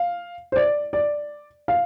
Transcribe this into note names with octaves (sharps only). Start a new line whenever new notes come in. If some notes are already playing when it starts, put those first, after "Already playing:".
Already playing: F5
C5
D5
D5
F5